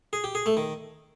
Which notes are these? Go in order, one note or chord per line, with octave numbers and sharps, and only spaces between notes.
G#4
G4
G#4
A3
D#3